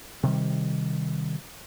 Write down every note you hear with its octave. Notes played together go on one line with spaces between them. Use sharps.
C3 D#3 G3